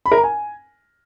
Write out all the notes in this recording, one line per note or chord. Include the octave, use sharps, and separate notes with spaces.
B5
A#4
A#5
G#5